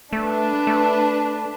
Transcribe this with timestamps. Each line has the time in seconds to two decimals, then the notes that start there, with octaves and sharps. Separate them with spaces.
0.13 A3 D4 B4
0.67 A3